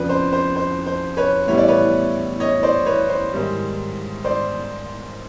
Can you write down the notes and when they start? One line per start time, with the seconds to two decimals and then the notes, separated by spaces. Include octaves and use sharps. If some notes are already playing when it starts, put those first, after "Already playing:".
Already playing: F2 C#3 F3 B4 D5
0.09 C5
0.33 C5
0.56 C5
0.86 C5
1.17 B4 C#5
1.48 A2 E3 G3 B3 E4 C#5
1.58 D5
1.68 B4 C#5
2.40 C#5 D#5
2.63 C5 D5
2.86 B4 C#5
3.09 C5
3.33 G#2 D#3 G3
4.25 C5 D5